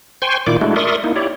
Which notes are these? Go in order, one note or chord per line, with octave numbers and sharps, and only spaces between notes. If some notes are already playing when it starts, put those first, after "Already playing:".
C5 G5 G#5 C6 C#6
A#2 D#3 E4 F4 D5 D6
G#3 A3 D4 E4 F#4
A#4 D5 E5 C6 C#6 D#6
A#3 D#4 E4
E4 G4 C#5 D5